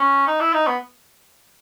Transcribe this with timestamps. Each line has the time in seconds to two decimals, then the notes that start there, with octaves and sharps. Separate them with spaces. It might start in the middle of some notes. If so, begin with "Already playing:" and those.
Already playing: C#4
0.27 D#4
0.41 E4
0.53 D#4
0.67 B3